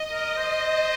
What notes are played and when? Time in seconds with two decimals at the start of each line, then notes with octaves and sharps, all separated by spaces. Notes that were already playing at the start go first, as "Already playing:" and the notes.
Already playing: D#5
0.12 A#4
0.37 C5